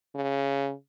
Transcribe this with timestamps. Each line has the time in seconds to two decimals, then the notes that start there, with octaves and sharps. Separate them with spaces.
0.15 C#3